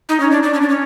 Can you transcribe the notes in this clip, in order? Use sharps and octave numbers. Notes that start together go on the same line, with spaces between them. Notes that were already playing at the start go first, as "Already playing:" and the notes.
D#4
C#4
D4
D4
C#4
D4
C#4